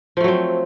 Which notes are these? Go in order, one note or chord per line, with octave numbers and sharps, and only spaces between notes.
F3 F#3 A3 C4